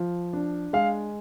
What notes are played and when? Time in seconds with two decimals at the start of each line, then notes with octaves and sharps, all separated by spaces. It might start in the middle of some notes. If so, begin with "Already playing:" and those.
Already playing: F3
0.33 D4
0.73 G#3 F5